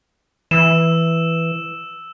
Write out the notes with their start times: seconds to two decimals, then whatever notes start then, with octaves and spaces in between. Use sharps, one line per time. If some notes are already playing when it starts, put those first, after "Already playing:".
0.51 E3 E6 E7